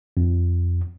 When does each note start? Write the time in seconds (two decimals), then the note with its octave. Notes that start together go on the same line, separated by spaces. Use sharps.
0.17 F2